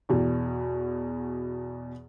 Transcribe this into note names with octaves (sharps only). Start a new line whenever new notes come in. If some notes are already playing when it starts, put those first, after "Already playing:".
E2 B2